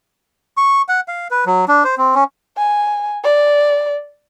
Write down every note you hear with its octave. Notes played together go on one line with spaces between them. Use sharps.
C#6
F#5
F5
B4
F#3
D4
C5
C4
C#4
G#5
D5